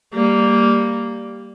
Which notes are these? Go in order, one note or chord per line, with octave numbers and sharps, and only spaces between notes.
G3 A#3